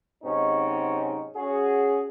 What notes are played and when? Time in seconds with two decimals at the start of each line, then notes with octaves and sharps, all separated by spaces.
0.23 G#2 C3 F#3 C4 C#4 D#4
1.36 C#4 F#4 G#4